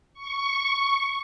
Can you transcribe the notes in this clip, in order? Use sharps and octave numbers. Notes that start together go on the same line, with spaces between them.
C#6